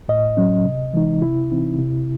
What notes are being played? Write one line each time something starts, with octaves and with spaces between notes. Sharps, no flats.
A2 D#5
F#3 C#4
C3
E3 G#3 D#4
C3 E4
E3 C4 D#4
C3